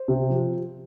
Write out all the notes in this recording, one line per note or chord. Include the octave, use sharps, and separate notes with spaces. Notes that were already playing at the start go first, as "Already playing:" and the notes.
Already playing: C5
C3
F3